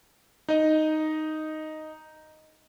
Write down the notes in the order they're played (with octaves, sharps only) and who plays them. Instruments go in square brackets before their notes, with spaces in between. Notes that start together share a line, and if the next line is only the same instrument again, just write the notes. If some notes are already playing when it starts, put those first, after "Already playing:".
[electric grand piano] D#4 D#5